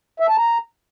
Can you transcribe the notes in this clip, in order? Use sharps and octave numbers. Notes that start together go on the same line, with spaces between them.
E5
A5
A#5